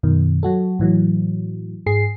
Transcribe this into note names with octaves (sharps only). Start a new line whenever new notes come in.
F#2 B2 D#3
F#3 F#4 A4
A2 E3 F#3
G#2 G#4 C7